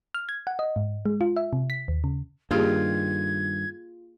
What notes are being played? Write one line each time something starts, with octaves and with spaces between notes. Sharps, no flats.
F6
G#6
F#5
D#5
G#2
G#3
F4
E5
C3
B6
D#2
C#3
G2 D#3 A#3 F4 G4 G#4 G5 G#6